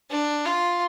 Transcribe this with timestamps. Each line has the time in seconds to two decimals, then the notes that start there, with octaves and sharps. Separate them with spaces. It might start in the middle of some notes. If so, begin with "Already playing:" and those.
0.10 D4
0.45 F4